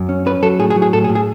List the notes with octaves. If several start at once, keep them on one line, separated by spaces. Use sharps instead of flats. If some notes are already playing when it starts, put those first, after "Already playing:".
Already playing: F#2
C#4
C#4 B4
F#3 A4
A2 G#4
G#4
F#3
G#4
A2 A4
G#4
A2
G#4